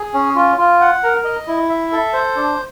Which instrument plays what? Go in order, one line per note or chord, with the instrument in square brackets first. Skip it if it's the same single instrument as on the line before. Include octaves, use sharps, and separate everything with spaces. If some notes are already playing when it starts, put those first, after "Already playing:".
Already playing: [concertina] G#4
C#4
F4
F4
F#5
A#4
D#5
E4
E5
A4
C5
D4